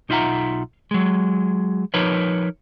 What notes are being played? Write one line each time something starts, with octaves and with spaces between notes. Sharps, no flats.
B1 D#4 F4 E5 F#5 A#5
F#3 G#3
F3 D#4 A#4 B4 C#5